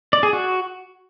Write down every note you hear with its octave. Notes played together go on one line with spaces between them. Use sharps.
D5
G#4
F#4